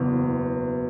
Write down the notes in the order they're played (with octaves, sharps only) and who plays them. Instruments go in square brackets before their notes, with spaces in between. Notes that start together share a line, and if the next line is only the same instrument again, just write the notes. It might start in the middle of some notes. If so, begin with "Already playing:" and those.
Already playing: [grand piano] F#1 E2 B2